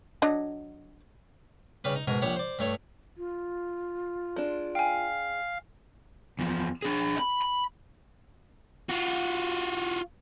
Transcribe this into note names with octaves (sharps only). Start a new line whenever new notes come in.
F#3 D4 D#5
C#3 G3 B4
D#4
G#2 B2 A#4 G#5
A#1 G4 C#5 F#5 B5
C5 D5
G2 A3 C#5
F4
G#3 D4
F5 G5 G#5
E2 F3
D4 G#4
D#5 B5
B5
F4 F#4